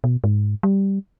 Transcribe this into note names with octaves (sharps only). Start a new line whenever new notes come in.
B2
G#2
G3